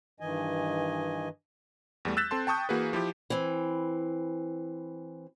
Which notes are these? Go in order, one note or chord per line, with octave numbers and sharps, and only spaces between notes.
G2 D#3 E3 D#5 G#5
E2 G3 A3
E6 F#6 G6 A6 B6 E7
C4 A4 A5 C6
G5 A5 C#6 D#6 G6
E3 A#3 F#4 G#4 B4
F3 E4 G4
E3 C4